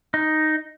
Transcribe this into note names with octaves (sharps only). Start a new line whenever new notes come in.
D#4